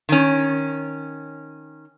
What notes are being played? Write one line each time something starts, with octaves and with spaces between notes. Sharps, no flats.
D#3 C#4